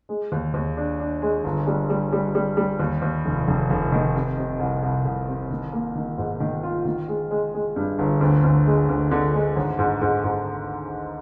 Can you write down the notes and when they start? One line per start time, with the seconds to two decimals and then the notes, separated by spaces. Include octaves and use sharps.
0.09 G#3
0.32 D#2
0.54 D#2
0.77 D4
0.99 D4
1.22 G#3
1.44 G1
1.67 G3
1.90 G3
2.13 G3
2.35 G3
2.57 G3
2.79 D#2
3.02 D#2
3.25 F1
3.48 F1
3.70 F1
3.92 D#3
4.15 C3
4.38 C3
4.60 C2
4.83 C2
5.05 C2
5.28 C3
5.50 D#3
5.72 A#3
5.95 D#3
6.18 G#2
6.40 D#3
6.63 F4
6.85 D#3
7.08 G#3
7.31 G#3
7.54 G#3
7.76 G2
7.99 G1
8.21 D2
8.44 D2
8.66 G#3
8.89 D2
9.11 D3
9.34 G#3
9.56 G#1
9.79 G#2
10.02 G#2
10.24 G#2